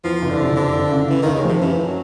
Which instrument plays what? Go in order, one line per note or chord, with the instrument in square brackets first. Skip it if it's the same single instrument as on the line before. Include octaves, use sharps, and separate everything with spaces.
[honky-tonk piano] E2 [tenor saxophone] F3
[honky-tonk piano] F#1
[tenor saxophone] D3
[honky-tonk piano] C3
[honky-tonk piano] F2 [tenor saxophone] D3
[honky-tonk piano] F#1
C#3
[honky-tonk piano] C#3 [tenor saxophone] E3
[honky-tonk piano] D#2 [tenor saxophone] D#3
[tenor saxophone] C#3
[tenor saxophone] C3 [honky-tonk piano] F3
[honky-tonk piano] F#2 [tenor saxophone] E3
[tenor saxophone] F#3